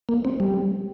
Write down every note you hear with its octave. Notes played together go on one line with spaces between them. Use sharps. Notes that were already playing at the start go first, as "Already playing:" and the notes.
A#3
C4
G3